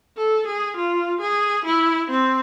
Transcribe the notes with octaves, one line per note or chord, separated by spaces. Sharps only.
A4
G#4
F4
G#4
E4
C4